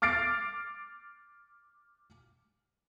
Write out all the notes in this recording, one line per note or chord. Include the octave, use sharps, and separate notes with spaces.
D6 F6 A6 C7 D7